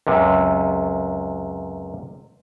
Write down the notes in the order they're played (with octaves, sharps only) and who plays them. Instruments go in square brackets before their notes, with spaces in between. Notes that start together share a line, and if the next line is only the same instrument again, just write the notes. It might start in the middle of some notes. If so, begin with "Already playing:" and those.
[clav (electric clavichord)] C#2 F#2 C3